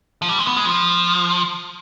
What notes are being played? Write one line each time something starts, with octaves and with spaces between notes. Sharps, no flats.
F3
G3
G#3
B3
G#3
F3